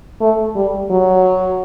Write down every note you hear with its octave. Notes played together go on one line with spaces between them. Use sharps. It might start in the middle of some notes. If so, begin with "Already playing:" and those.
A3
G3
F#3